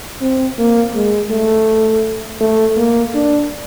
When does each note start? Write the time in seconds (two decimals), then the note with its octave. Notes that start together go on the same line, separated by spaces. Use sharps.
0.22 C4
0.59 A#3
0.95 G#3
1.31 A3
2.41 A3
2.77 A#3
3.14 D4